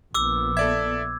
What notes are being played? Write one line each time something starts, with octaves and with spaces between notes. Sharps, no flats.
A#1 B3 D6 E6
A4 D5 E5 G#6